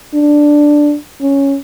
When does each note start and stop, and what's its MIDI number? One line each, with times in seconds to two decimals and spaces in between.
0.14 0.95 62
1.22 1.56 61